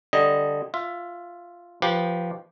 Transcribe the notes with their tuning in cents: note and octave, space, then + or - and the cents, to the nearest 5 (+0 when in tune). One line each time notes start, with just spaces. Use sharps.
D3 +0 G3 +0 D#5 +0
F4 +0 E5 +15
F3 +0 G4 +0 B4 -15